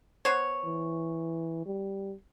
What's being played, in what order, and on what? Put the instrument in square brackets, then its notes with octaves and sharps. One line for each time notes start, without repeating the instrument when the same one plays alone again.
[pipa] B3 C5 C#5
[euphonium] E3
G3